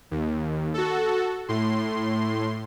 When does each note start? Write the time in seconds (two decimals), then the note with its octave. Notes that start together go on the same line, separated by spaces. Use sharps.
0.11 D#2
0.74 F#4 A4
1.49 A2 C6